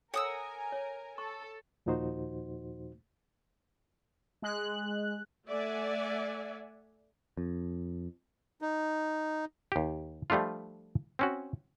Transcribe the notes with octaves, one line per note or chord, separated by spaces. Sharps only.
A4 A#4 C#5 F#5 G#5 D#6 E6
C#5
A4 C#6
D#2 A#2 F3 D#4 F#4 C5
G#3 F#6
A3 D5 E5 F#5 G#5
F2
D#4
D#2 G4
F3 G3 A3 D4 F4
C4 C#4 F#4